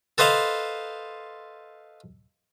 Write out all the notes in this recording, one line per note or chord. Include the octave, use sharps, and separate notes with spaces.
A4 B4 C5 D#5 F5